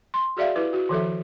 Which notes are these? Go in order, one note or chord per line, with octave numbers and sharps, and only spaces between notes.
C6
F#4 G#4 D5 E5 F5
E4 G4 B4
F#4
D#3 F3 A4 E5